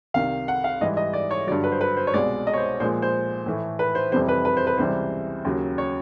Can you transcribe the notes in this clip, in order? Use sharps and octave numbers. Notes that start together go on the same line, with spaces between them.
C2 C3 D#3 F5
F#5
F5
G#2 E3 G3 D#5
D#5
D5
C#5
G2 D3 F#3 D5
B4
C5
B4
C5
C#5
C2 B2 G#3 D5
D#5
C#5
C5
A#2 F3 G#3 C5
C5
A2 E3 A3
B4
C5
F2 C3 E3 G3 C5
B4
B4
C5
B4
C#2 C3 E3 G3 C5
D#2 C#3 F#3
C#5